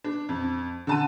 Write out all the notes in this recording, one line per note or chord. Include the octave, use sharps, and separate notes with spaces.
D4
F2
D3 A5 D#7